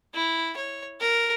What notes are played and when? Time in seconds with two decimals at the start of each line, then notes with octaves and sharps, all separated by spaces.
0.15 E4
0.56 C#5
1.01 A#4